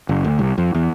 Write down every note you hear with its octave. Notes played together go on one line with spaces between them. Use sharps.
F#1
D2
C2
F2
E2